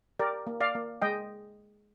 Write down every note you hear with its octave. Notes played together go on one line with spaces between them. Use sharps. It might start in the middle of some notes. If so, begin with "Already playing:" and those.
G4 A#4 D5
A#3
D5 F5
A#3
G#3 D#5 G5